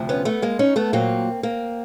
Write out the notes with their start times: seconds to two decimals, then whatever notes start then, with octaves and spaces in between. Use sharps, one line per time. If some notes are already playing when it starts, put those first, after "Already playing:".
Already playing: D2 C3 F3
0.09 B3 C#4
0.25 A3 B3
0.42 G#3 A#3
0.59 C#4 D#4
0.76 A3 B3
0.93 A#2 F#3 A#3 C4
1.43 A#3 C4